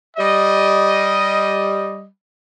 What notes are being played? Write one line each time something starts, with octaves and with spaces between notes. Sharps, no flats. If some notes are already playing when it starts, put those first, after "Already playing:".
G3 D#5